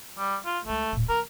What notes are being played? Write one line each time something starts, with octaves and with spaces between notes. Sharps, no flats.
G3
F4
C#2 G#3 A3
D#1 A2
D#3 A3 A#4